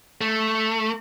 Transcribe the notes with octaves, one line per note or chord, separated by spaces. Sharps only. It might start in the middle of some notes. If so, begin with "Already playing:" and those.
A3